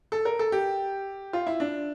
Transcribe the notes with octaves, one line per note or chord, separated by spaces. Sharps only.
A4
A#4
A4
G4
F4
E4
D4